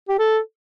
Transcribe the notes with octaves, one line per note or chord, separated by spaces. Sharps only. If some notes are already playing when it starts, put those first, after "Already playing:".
G4
A4